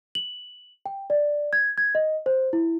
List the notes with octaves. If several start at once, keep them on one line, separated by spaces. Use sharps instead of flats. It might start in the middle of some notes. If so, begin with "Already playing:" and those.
F#7
G5
D5
G#6
G#6
D#5
C5
E4